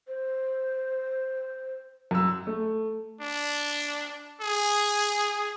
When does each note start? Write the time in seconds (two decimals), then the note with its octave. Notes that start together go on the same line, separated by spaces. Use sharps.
0.08 C5
2.11 F#2 E6
2.47 A3
3.21 D4
4.41 G#4